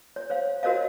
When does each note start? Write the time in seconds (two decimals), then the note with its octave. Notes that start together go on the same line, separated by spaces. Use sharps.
0.16 C#5
0.30 C5 C#5 F5
0.63 F#4 A#4 C5 C#5 D#5 F5